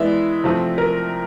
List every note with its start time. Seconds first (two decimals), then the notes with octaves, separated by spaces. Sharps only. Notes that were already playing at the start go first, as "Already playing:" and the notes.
Already playing: E3 G#3 B3 D5 E5
0.44 C3 F3 A3 C4
0.78 A#4